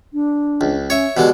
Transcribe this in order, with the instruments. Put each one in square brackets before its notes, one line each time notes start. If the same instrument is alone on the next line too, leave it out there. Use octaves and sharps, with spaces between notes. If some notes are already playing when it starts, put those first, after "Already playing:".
[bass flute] D4
[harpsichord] C#2
[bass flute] C#4 [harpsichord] C#5 E5
[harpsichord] B2 D3 G#3 [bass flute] G4